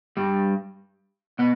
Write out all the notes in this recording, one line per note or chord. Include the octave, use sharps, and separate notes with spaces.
G2 G3
B2 B3